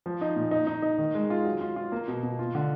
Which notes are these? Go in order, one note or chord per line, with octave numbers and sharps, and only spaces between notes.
F3
D#4
A#2
D#4
D#4
D#4
D#3
G#3
F4
F#3
F4
F4
A#3
B2
B2
F4
D3